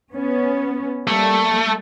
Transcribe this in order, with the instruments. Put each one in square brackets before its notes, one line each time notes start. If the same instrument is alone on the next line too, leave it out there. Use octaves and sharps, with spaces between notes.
[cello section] B3 C#4
[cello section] G3 A#3 [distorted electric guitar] A3